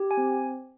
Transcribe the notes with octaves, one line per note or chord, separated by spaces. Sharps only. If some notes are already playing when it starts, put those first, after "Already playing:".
Already playing: G4
G#5
C4